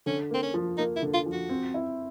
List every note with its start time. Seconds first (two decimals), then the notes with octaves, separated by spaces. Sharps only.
0.06 D3 C#4
0.31 A#3 C4
0.43 C#4
0.54 F3
0.78 A#3 D#4
0.96 E4
1.02 D3
1.14 F4
1.26 F3
1.32 F#4
1.49 C4
1.74 E4